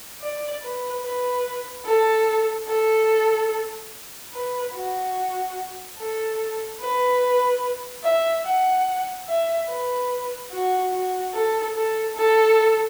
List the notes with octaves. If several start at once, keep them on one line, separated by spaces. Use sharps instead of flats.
D5
B4
B4
A4
A4
B4
F#4
A4
B4
E5
F#5
E5
B4
F#4
F#4
A4
A4
A4